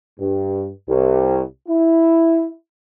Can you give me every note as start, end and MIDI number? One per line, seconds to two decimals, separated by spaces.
0.19 0.69 43
0.88 1.39 36
1.68 2.51 64